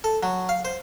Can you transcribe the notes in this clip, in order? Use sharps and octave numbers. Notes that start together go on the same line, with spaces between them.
A4
F#3
F5
C5